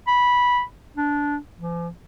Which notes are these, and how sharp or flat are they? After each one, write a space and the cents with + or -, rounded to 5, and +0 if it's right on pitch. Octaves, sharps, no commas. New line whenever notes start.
B5 -10
D4 -15
F3 -45